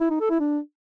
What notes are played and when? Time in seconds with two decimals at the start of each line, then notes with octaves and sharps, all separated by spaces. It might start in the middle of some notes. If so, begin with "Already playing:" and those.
0.01 E4
0.10 D#4
0.20 A4
0.30 E4
0.40 D4